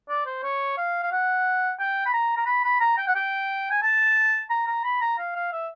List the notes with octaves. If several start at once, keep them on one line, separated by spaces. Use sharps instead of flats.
D5
C5
C#5
F5
F5
F#5
G5
B5
A#5
A#5
B5
B5
A#5
G5
F#5
G5
G#5
A5
A#5
A#5
B5
A#5
F5
F5
E5